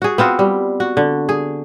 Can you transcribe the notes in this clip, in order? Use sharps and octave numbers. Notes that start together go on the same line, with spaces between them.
F#4 G#4
B3 C4 F4 F#4
G3
F#4
D3
G#4